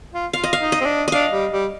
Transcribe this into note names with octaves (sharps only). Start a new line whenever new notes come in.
F4
F4 F5
D#5
F5
D#4
D#5
C4
D4
D4 D#5 F5
G3
G3